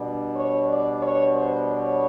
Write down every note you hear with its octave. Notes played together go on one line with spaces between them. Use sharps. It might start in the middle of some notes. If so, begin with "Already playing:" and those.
Already playing: B2 G3 B3 D4
C#5
D5
C#5
C5
C#5